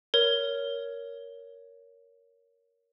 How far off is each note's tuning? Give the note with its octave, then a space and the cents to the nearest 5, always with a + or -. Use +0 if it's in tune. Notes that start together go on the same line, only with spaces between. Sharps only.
A#4 +0 C#5 +15